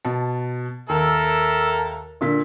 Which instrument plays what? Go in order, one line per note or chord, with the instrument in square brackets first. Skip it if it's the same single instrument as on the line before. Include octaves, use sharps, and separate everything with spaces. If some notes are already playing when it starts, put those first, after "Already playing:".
[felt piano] B2 A5
[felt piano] D#2 [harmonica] A4 A#4 E5
[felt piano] A#2 D3 B6